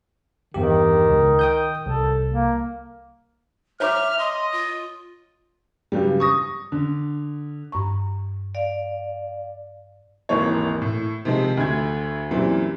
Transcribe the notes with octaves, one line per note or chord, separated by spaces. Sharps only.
E2 G2 D#3 G4
C#2
G5 D#6 G6
C2 A4
A#3
C#5 E5 A#5 D6 F6
D#5 C6
F4
G2 C#3 F#3 G3
C#6 D#6 A#6
D3
G2 A#5 C#6
D5 F5
D#1 G#1 E3 A#3 C#5
A2
C3 D#3 F3 G#3 C4
D2 D3 A3 G#6
F#2 A#2 E3 G3 C4 E4